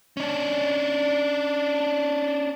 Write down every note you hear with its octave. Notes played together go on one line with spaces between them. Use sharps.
C#4 D4